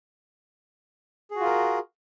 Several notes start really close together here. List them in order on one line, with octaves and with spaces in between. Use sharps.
G#4 F#4 F4 A#4